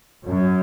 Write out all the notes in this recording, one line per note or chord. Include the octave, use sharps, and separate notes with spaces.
F#2